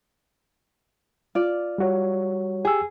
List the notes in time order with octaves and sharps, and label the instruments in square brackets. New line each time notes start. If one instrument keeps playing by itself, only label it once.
[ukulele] F4 D5
[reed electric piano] G3 F#4 C#5
[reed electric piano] G4 E6 [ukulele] G#4